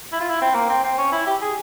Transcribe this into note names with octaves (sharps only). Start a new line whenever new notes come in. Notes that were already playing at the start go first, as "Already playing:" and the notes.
E4
F4
E4
C4
A#3
C4
C4
C#4
E4
G4
G#4